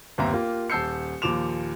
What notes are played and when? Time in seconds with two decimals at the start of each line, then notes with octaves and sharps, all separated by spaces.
0.18 G1 D#2 C4 E5 A#5
0.33 A#3 F4 G4
0.70 D#1 A5 E6 G6 C7 C#7
1.22 D#2 A#2 F3 D6 E7 F7